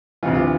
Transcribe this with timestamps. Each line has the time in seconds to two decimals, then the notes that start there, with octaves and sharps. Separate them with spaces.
0.23 D2 C3 E3 F4
0.35 F4